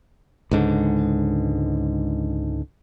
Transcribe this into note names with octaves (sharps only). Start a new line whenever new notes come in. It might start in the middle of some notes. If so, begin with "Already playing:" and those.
C#2 G#2 D3